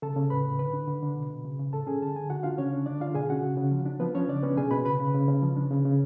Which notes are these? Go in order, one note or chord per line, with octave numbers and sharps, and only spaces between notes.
C#3 A4 A5
C#3
A2 B4 B5
A2
D3 B4 B5
D4
D3
D3
B2
B2
C#3
C#3
A2 A4 A5
C#4 G#4 G#5
D3 A5
D3 G#5
D3 F#4 F#5
D4 F4 F5
C#3 C#4 C#5
D4
D3 D4 D5
D3 F4 F5
B2 G#4 G#5
C#4 F#4 F#5
C#3
C#3
F3
D4
F3 B3 B4
F3 C#4 C#5
C#3 D4 D5
B3 C#4 B4
B2 G#4 G#5
B2 B4 B5
C#3 B4 B5
C#3
C#3
C#3
F3
D4
C#3
C#3